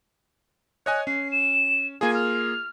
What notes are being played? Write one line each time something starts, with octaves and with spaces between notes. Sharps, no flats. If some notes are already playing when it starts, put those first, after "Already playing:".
C#5 D#5 G#5 F#6
C#4 C7
E7
A#3 F4 G#4 G#5
F6